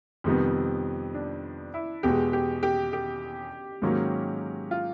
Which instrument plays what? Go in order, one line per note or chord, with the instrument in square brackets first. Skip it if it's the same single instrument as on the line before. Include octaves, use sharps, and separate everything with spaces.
[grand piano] F2 C3 D#3 G3 B3
[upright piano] D4
E4
[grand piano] E2 B2 G#3 [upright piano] G4
[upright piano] G4
G4
G4
[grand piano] G#2 D#3 F#3 A#3 C#4
[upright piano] F4